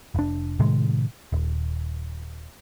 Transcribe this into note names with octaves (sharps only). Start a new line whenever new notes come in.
F1 D4
A2 C3 D#3 G#3
D#1